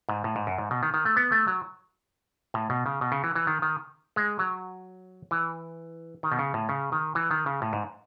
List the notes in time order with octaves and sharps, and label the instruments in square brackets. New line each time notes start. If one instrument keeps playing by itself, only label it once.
[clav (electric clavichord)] G#2
A2
G#2
F#2
G#2
B2
D#3
D#3
A3
B3
A3
F#3
A2
B2
C#3
B2
C#3
E3
E3
D#3
D#3
G#3
F#3
E3
D#3
B2
C#3
A2
C#3
D#3
E3
D#3
C#3
A2
G#2